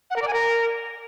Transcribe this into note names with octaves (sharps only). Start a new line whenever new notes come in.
F#5
A#4
D5
G#5
A#4